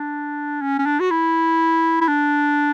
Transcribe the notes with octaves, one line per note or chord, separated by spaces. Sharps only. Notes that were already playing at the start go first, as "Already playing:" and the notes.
Already playing: D4
C#4
C#4
D4
F#4
E4
E4
D4